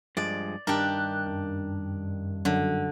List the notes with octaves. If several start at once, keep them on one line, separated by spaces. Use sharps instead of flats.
G2 F3 G#3 D5
G2 D#3 D4 G4 A#4 F#6
F#2
F#2 D3